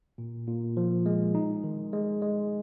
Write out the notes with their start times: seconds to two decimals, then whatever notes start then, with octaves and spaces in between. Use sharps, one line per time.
0.18 A#2
0.47 A#2
0.77 F3
1.06 G#3
1.35 D#4
1.64 D#3
1.93 G#3
2.22 G#3